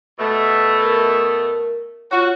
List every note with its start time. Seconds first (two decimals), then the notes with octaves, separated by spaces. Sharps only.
0.19 B2 A3
0.82 A#4
2.11 F4 F#4 C#5